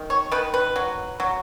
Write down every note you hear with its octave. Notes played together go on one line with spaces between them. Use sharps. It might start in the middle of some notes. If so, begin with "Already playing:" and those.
Already playing: D#3
C#5
D#3 B4
B4
F#3
F#3